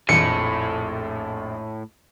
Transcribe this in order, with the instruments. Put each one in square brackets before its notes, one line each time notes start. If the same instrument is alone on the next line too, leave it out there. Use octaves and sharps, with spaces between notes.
[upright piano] A#1 F2 [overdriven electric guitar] A2 [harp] C#7